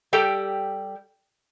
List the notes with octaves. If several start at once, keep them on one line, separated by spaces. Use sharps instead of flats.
G3 G4 A4 G5